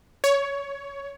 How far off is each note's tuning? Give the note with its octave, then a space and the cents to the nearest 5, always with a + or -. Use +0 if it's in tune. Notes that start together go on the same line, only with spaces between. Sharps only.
C#5 +15